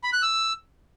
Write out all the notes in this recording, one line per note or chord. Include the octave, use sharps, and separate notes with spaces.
B5
F#6
E6